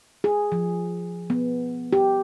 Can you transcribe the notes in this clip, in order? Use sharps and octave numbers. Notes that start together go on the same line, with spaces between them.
G#4
F3
B3
G4